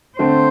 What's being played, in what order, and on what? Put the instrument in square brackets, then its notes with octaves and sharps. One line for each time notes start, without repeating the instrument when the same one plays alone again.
[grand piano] D3 A3 C4 [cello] C5